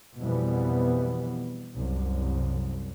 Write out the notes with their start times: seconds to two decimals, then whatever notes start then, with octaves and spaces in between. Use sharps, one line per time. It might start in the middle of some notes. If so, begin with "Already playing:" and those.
0.19 F2 B2 E3 G3 B3
1.76 C2 F#2